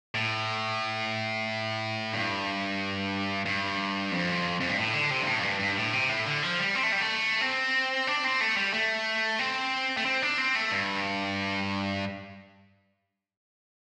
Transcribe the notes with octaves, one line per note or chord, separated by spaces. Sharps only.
A2
G2
G2
F2
F2
G2
A2
D3
C3
G2
A2
F2
G2
G2
A2
C3
A2
D3
F3
G3
C4
A3
G3
A3
C4
D4
C4
A3
G3
A3
C4
A3
C4
D4
C4
A3
G2